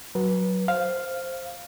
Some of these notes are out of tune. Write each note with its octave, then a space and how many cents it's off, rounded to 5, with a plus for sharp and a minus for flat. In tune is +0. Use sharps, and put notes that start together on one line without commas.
F#3 +0 B4 -25
C5 +5 F5 +0